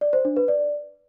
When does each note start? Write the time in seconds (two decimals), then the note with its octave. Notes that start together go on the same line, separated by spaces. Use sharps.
0.01 D5
0.13 C5
0.25 D4
0.37 B4
0.48 D5